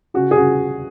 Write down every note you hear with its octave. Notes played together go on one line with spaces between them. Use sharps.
C#3 F#4
G#4
C#3 F#4